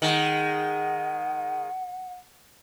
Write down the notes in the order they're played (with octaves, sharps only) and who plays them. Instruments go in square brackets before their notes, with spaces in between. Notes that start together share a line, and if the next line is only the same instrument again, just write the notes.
[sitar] D#3 G#3 [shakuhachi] F#5